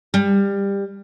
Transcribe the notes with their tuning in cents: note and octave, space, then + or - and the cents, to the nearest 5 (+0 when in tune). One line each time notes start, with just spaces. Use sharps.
G3 +20